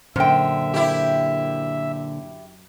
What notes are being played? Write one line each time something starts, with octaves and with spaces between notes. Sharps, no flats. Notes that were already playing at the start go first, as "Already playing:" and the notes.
F#2 A#2 D3 C5 E5 G5
E4 G4